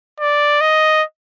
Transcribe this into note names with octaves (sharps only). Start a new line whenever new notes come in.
D5
D#5